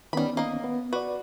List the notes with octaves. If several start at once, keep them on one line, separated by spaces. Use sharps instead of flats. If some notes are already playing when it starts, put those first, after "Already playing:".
D#3 G3 B3 C#4 B5
A#3 D#5
B3
F#4 B4 D5